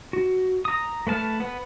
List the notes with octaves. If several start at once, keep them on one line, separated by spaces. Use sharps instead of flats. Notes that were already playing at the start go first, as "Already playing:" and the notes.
F#4
A#5 D#6
A3 B4 A5 F6
B3 B4